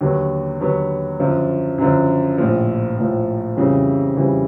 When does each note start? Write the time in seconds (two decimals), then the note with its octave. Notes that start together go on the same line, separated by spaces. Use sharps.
0.01 D#2 D3 F#3 B3
0.60 D#2 D3 F#3 B3
1.19 F#2 D3 F3
1.78 F#2 D3 F3
2.38 A#1 A2 F3
2.97 A#1 A2 F3
3.57 F2 C#3 E3 G3
4.16 F2 C#3 E3 G3